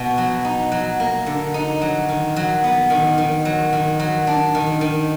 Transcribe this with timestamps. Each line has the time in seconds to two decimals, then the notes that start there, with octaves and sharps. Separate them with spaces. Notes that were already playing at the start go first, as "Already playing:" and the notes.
Already playing: B2 B3
0.18 F#3
0.45 D#4
0.72 F#3
1.00 A#3
1.26 D3
1.54 D#4
1.82 F#3
2.09 D#3
2.36 F#3
2.64 B3
2.90 D#3
3.18 D#3
3.45 F#3
3.73 D#3
4.00 F#3
4.27 D4
4.55 D#3
4.81 D#3